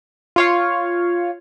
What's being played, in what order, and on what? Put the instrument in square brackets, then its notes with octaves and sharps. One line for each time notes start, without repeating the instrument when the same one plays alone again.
[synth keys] F4 C#5 F5